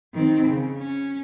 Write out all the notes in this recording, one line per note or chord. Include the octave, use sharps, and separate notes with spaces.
D#3 C4
C#3
C#4